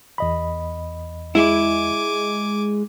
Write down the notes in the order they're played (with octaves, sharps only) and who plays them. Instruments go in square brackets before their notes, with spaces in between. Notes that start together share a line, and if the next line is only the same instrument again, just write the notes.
[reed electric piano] E2 D#5 B5
[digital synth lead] G#3 [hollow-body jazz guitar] E4 [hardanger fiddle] G#5 D6